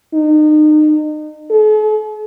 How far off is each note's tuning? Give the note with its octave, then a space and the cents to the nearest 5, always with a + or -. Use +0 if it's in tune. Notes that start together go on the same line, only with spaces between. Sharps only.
D#4 -30
A4 -45